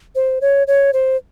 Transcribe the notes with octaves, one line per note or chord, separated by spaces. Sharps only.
C5
C#5
C#5
C5